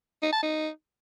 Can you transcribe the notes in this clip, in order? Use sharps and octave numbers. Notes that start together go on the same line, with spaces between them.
D#4
A5
D#4